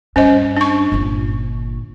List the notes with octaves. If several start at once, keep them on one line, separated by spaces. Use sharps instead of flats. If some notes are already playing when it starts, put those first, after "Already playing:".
G2 C#4 C5 D#5
D4 C#6
G1 A#2